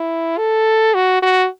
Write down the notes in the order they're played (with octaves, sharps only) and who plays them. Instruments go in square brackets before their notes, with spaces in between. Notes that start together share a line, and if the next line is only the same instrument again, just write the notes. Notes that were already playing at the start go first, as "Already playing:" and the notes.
Already playing: [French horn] E4
A4
F#4
F#4